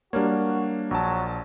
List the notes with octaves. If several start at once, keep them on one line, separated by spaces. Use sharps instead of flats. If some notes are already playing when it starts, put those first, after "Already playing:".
G3 A#3 D4 F#4 A#4 C#5
A#1 F#3 A5